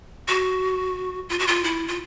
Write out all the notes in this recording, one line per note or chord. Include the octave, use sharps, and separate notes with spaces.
F#4
F4
F#4
F4
E4
F4